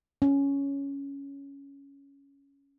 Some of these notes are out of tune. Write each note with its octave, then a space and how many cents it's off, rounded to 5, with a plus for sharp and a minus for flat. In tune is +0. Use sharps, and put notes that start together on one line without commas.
C#4 +5